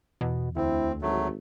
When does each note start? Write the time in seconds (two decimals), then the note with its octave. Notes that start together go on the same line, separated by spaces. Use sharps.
0.21 E2 B2
0.56 D2 C4 E4
1.02 G#1 F#3 A3